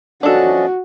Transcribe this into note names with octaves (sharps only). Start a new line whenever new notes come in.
F3 C#4 D4 F#4 A4 D#5